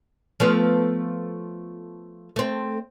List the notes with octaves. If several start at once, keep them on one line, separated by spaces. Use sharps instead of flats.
F3 A3 B3
A3 C4